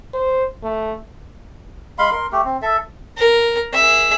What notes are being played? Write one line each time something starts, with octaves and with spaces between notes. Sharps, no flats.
C5
A3
G#3 F5 B5 C6
A#4 C6
A3 G4
C4
A4 E5
A#4
G#4 E5